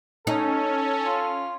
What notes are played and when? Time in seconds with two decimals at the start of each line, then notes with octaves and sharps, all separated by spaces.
0.27 C#4 D#4 A4
1.05 F4